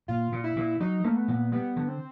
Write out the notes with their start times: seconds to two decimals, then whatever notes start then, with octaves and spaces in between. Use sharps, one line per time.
0.08 A#2 F4
0.32 A#2
0.44 E4
0.56 A#2
0.80 F#3 D#4
1.04 A3 A#3
1.16 B3
1.28 A#2
1.52 G3 B3
1.76 D3
1.88 C4